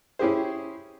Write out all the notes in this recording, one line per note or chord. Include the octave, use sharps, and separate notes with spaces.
C#4 E4 G4 G#4 C5